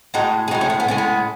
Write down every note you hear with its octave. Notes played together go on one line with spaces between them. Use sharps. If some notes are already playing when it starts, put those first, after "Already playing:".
A2 G#3 D#4 F#4
G#4
A2 G#3 D#4 F#4
C#4 E4
A3
B3
A2 G#3 C#4
B3